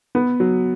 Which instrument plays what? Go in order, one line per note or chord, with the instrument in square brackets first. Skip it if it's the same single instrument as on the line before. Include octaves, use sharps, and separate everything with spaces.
[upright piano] B3
F#3